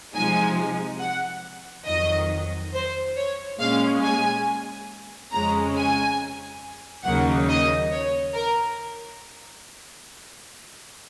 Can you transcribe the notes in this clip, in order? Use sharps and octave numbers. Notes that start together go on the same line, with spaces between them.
C3 F3 G#3 D#4 G#5
F#5
F2 D#3 F#3 D#5
C5
C#5
A#2 G#3 C#4 F5
G#5
F2 C#3 G#3 C#4 A#5
G#5
D#2 C#3 F#3 A#3 D#4 F#5
D#5
C#5
A#4